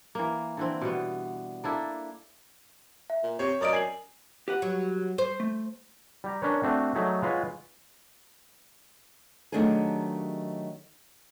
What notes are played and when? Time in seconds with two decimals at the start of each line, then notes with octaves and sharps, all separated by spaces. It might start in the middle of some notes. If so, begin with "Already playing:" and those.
0.15 E3 A#3
0.57 D3 E3 C4
0.81 B2 G3 B3
1.64 A#3 D4 E4 A4
3.10 E5
3.23 A#2
3.39 C3 C#5 C#6
3.61 F#2 A#4 D5 D#5 D6 D#6 D7
3.73 G#5 G#6 C7 F#7
4.48 G4 B4 F#5
4.62 F#3
5.18 C5
5.40 A3
6.24 G3 G4 A#5
6.42 C#4 D4 A#4 B4 C#5
6.63 A3 C4 D4 F#4
6.95 F#3 A3 D#4 G#4 D5 E5
7.22 G#3 F4 B4 C#5 F#5 G#5
9.52 D#3 F#3 A3 D4 G4 G#4